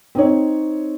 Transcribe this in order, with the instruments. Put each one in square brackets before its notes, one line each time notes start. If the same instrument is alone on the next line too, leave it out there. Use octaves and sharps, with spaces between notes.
[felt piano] C4 D#4 C#5